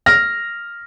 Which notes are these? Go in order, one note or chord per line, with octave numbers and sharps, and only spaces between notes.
F6 A#6